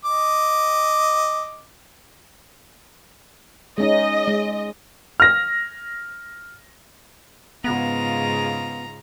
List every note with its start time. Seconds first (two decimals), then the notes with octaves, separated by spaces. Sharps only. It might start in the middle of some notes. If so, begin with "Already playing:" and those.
0.05 D#5 D6
3.78 G#3 C#4 D#4 D#5
4.27 G#3
5.20 F6 A#6
7.64 G#2 C#3 B3 F4 A#5